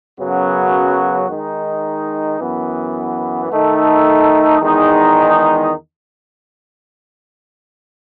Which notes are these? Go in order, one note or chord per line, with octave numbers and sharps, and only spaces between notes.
F#2 C#3 F#3 B3 F#4
D#3 G#3 D#4
F#2 E3 B3
D#3 A3 D#4 A4
E2 D#3 G#3 D#4